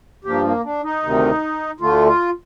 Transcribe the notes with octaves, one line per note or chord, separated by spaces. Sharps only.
G2 F3 A#3 G4
A#3
D4
D#4
D2 C3 D#3
D2 D3 A3 F4
F4